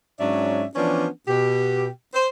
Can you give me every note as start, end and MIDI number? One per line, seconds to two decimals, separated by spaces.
0.19 0.64 44
0.19 0.64 54
0.19 0.64 61
0.19 0.64 62
0.19 0.64 74
0.19 0.64 76
0.76 1.07 52
0.76 1.07 53
0.76 1.07 59
0.76 1.07 61
0.76 1.07 62
1.28 1.88 47
1.28 1.88 67
2.14 2.27 72